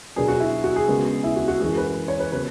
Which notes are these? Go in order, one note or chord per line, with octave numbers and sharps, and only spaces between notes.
B2 F#3 B3 D4 G#4
F#4
E4
F#4
G#4
C#3 G#3 B3
E4
F#4
F#4
F#2 E3 G#3 G#4
B4
C#5
B4
C#3 F#3 B3 B4